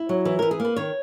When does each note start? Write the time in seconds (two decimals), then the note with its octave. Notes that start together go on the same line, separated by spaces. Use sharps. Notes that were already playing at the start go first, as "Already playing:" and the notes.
Already playing: E4
0.09 F#3
0.25 E3 B4
0.39 E3 A#4
0.51 G#4
0.60 A#3 B4
0.76 D#3 C#5